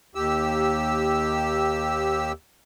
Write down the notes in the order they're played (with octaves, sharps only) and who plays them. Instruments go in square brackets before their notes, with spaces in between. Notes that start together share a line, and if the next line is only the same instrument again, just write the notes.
[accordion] D#2 G4 E6